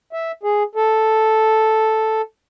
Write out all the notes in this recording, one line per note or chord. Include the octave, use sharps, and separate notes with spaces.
E5
G#4
A4